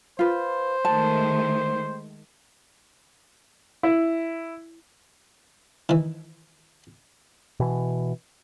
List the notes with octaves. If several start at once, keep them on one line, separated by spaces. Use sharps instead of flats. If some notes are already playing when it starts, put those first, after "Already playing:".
F4 B4 C5
D#3 G#3 A3 A5
E4
D#3 E3
B2 E3